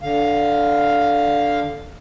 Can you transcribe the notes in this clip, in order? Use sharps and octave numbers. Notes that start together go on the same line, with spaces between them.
D3 F5